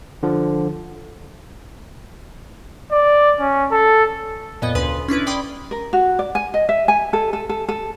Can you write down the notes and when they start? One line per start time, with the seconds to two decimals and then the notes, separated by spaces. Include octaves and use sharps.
0.23 D3 F3
2.91 D5
3.40 C#4
3.71 A4
4.62 F2 A#2 B3 D#5
4.75 D2 C#3 B4 C6 D#6
5.08 C#4 D4 E4 B4
5.27 D5 G5 B5 C6 D6 D#6
5.71 A#4
5.93 F#4
6.19 D5
6.35 G#5
6.54 D#5
6.69 E5
6.88 G#5
7.13 A4
7.33 A4
7.49 A4
7.69 A4